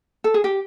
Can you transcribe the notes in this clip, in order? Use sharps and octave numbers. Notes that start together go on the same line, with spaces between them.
A4
G#4
G4